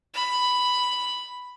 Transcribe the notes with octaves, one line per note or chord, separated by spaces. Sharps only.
B5